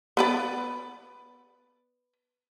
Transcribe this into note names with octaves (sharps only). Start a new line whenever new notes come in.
B3 B4 D5